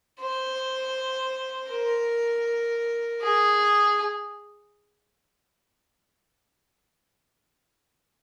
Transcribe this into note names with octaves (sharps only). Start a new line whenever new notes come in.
C5
A#4
G#4